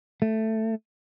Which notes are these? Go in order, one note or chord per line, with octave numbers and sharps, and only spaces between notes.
A3